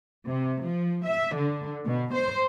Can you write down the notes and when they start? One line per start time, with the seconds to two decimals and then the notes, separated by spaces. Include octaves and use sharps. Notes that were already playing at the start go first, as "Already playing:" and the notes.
0.27 C3
0.64 F3
1.06 E5
1.36 D3
1.86 B2
2.14 C5